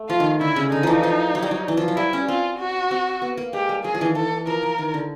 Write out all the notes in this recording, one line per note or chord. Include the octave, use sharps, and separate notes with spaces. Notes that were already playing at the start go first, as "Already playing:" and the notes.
Already playing: A3
F3 F4
D#3
D3 E4
C#3
D3 D#4
E3 F3
F3
F#3
G3
F#3
E3
F3
F#3
G3 E4
C#4
C4 F4
F#4
C4
B3
A#3
G#3 G4
G3
F#3 G#4
F3
D#3 E3
E3 A4
F3 A#4
E3
D#3
D3